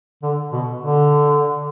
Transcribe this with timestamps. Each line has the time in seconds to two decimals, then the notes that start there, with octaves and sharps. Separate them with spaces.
0.23 D3
0.52 B2
0.80 D3